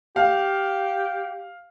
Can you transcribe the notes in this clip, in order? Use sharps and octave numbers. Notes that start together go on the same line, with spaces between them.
G4 F5